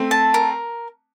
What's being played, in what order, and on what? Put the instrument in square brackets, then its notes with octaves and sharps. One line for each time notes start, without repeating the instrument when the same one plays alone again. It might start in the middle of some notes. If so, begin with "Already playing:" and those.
Already playing: [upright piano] A3 C4
[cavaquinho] A5
A#4